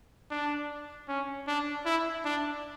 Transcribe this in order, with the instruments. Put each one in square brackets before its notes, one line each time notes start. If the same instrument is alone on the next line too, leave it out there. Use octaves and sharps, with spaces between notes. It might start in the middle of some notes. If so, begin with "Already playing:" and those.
[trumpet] D4
C#4
D4
E4
D4